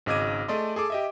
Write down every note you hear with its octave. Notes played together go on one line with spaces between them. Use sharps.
G#1 C#3 D#5 D6 G#6 D#7
A3 G#4 D5 D#5 C6
G#4 A4 D6
G4 D#5 E5